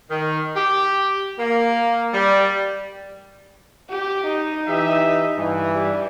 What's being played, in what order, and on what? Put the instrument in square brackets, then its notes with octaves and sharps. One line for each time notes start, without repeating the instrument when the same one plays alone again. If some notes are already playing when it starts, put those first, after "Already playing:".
[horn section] D#3
G4
A#3
G3
[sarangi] G4
D#4
[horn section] E3 G4 E5
G2 E3
[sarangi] G3